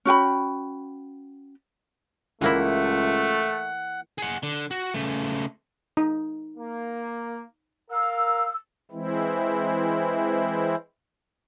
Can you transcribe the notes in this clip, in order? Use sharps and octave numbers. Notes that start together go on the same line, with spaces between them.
C#4 F#4 G5 B5
C#2 E3 A3 A#3 E4 F#5
G#4 F#5
D3
F#4
C#3 A3
D#4
A#3
A#4 F5 E6
E3 G#3 C4 E4